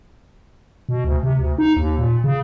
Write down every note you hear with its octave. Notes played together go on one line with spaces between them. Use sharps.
B2
D2
C3
D2
D#4
D#2
A#2
C#3